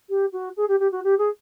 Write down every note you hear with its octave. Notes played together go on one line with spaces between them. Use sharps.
G4
F#4
G#4
G4
G4
F#4
G4
G#4